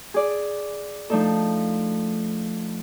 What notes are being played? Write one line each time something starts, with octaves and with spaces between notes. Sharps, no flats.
G#4 D5
F3 A3 D4 D#4 A4